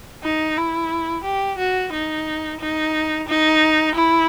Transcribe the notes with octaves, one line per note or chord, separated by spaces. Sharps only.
D#4
E4
G4
F#4
D#4
D#4
D#4
E4